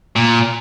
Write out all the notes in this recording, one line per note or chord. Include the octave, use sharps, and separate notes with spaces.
A#2